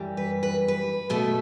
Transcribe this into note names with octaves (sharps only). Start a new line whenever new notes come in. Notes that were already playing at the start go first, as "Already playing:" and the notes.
Already playing: F#2 E3 G3
B4
B4
B4
B2 A3 A4